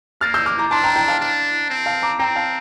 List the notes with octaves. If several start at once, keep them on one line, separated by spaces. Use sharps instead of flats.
A#3 F6 A6
E6 G6
D6 F6
A#5 D6
D4 A5 C6
G5 A#5
G5 A#5
F5 A5
D4
C4
F5 A5
A#5 D6
C4 G5 A#5
F5 A5